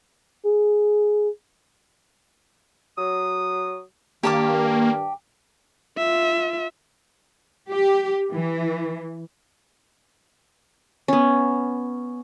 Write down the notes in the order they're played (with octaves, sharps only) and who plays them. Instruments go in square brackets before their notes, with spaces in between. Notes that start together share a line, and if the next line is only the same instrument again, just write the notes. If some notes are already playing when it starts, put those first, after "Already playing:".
[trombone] G#4
[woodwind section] F#3 D#6
[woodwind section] G2 D#3 [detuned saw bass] A#3 [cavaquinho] G4 A5 D6
[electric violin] F4 E5
[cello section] G4
E3
[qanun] B3 C#4